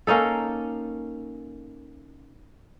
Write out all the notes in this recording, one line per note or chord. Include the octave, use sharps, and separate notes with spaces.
A#3 C#4 D#4 A4